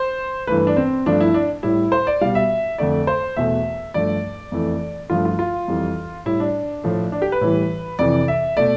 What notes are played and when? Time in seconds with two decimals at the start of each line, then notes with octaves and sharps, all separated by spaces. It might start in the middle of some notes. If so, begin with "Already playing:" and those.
Already playing: C5
0.47 G2 E3 A3 B4
0.58 B4
0.67 D4
0.77 C4
1.06 G2 F3 A3 D4
1.20 E4
1.34 D4
1.63 A2 G3 E4
1.92 C5
2.07 D5
2.21 B2 G3 F5
2.35 E5
2.78 F2 D3 A3 D5
3.07 C5
3.36 E2 B2 A3 E5
3.94 G2 F3 A3 D5
4.52 F2 E3 A3
5.10 G2 F3 A3 F4
5.25 F4
5.39 F4
5.68 F2 E3 G3
6.26 A2 G3 E4
6.40 D4
6.84 A2 F3 A3
7.12 D4
7.22 G4
7.32 B4
7.41 A2 E3 G3
7.99 F2 C3 E3 D5
8.28 E5
8.57 B2 A3 D5